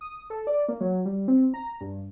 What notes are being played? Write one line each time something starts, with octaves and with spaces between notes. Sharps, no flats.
D#6
A4
D5
A#3
F#3
G3
C4
A#5
G2